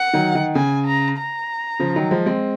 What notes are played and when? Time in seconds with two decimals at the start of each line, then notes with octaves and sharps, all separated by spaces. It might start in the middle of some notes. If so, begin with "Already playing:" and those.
Already playing: F#5
0.14 D#3 F#3
0.35 D#3
0.55 C#3 G#5
0.86 A#5
1.18 A#5
1.79 C#3 F3
1.96 D#3 F#3
2.11 F3 G#3
2.26 G#3 C4